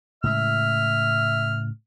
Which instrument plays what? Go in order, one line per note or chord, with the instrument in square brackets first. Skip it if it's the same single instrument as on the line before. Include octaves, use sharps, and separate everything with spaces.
[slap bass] A2 C#3 G#3 [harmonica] E5 F6